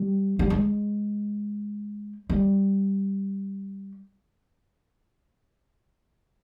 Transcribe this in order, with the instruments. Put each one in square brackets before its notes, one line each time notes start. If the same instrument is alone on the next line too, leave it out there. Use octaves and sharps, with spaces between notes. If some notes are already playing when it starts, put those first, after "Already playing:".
Already playing: [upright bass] G3
G3
G#3
G3